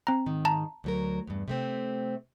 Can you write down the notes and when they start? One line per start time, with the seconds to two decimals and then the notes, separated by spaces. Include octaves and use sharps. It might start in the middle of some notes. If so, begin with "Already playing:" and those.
0.07 C4 A#5
0.26 G#2 D#3
0.45 A5 A#5
0.84 D2 F#3 A#4
1.27 E2 G2
1.48 C3 A3 C4